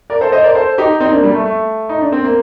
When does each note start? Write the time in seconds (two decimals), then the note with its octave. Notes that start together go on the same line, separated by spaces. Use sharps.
0.10 A#4 D5
0.21 A4 C5
0.32 C5 D#5
0.44 A#4 D5
0.55 A4 C5
0.78 D#4 G4
1.00 C4 D#4
1.12 A#3 D4
1.23 G3 A#3
1.34 A3
1.45 A3
1.89 D#4
2.01 D4
2.12 C4
2.24 A#3